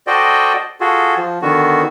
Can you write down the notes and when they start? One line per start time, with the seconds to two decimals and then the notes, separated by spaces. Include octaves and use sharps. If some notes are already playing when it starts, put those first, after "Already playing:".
0.07 F#4 A4 C5 D5 D#5 G5
0.80 F4 F#4 G#4 A4
1.17 F3
1.42 D3 D#3 B3 F#4